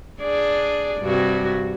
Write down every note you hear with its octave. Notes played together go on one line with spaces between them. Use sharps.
D4 G#4 D5
G2 C3 F#4